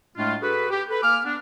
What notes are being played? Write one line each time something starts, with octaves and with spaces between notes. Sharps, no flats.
A2 G#3 A3 D4 F4
F#4 G#4 A4 B4
G4
A4 B4
A#3 G#5 D6 F6
B3 D4